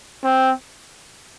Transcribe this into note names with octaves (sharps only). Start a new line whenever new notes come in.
C4